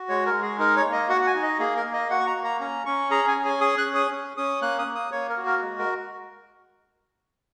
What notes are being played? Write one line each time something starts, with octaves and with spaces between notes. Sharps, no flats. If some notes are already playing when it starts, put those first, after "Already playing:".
Already playing: F#4
G#3 C#5
A#4
G#3
G#4
D#4 A#4
C#5
A#3
D#5
F#4 F#5
F#5
G#5
D#4
D#5
A#3 G#4
A#4
A#3
D#5
F#4 F#5
C#6
A#5
A#3
A#5
C#4 A#5
C#4 C#6
G#4 A#5
G#5
C#4
G#5
G#4 D#6
F#6
C#4
D#6
C#4
C#4 D#6
A#3 F#6
D#6
A#3
D#6
A#3 C#5
A#4
F#4
A#4
G#3
A#4